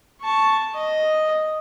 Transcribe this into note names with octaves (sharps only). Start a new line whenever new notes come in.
A5 C#6
D#5